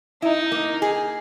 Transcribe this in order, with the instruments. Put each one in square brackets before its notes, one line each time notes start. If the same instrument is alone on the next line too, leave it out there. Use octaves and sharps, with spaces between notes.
[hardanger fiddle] D#4 [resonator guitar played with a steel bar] E4
[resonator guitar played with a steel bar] A#3
G#4